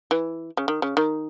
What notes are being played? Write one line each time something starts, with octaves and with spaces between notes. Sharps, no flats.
E3
C#3
D#3
C#3
D#3